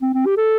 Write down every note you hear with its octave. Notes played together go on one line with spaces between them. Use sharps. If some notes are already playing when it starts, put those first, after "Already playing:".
C4
C4
G4
A4